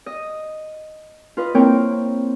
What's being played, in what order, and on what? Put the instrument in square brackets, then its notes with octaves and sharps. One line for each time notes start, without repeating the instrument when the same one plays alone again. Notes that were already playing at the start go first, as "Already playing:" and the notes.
[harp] D#5
F4 B4 D#5
A#3 C4 E4 A#4 C#5 G5